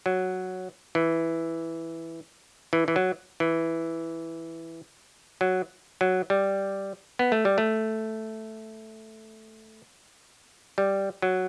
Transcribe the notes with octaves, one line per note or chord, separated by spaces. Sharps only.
F#3
E3
E3
E3
F#3
E3
F#3
F#3
G3
B3
A3
G3
A3
G3
F#3